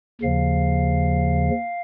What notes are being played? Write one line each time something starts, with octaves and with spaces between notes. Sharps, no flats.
D#2 C#3 F3 F5